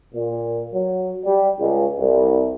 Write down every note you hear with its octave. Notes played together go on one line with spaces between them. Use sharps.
A#2
F#3
G3
C#2
C2